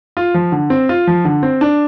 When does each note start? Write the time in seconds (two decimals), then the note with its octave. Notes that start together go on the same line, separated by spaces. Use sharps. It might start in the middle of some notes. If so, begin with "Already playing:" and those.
0.17 F4
0.34 F3
0.52 D3
0.70 C4
0.89 F4
1.07 F3
1.25 D3
1.43 C4
1.61 D4